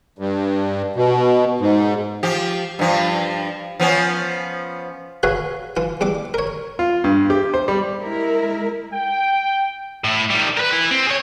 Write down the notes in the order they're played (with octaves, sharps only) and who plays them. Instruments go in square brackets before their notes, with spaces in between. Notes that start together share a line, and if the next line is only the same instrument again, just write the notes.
[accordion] G2
B2
G#2
[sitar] F3 G4
G2 F3
F3 B3 C#4
[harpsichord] F#4 G#4 B4 C#5 F5
E3 F4
E2 G3 D6
A#4 C#5
[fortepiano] F4
G2
G4
C5
G3
[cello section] G#3 E4 A#4
[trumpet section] G5
[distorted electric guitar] A2 E4
D#3 G3
A#4 B4
E4 B4
C4
G#4 C#5